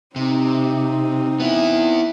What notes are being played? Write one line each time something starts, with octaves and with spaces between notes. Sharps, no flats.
C3 C4 D#4
B3 E4